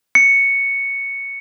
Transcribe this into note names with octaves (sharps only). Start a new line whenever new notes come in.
C#7